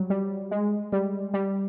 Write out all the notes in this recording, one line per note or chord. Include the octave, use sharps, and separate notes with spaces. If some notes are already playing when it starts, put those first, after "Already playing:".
Already playing: F#3 G3
G3
G#3
G3
G3